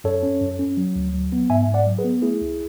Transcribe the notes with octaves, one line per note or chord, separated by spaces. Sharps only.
F#2 A4 C#5
C#4
F#2
C#4
F#3
D2
F#3
B3
G#2 E5 G#5
G#2
D5 F#5
F#3
G#4 B4
B3
A3 E4 G#4
C#2